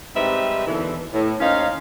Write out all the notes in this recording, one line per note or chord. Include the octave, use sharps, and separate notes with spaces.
G#2 G3 C4 D#4 B4 E5
D#2 B2 D3 E3
A2
D#2 C#4 D#4 C5 F5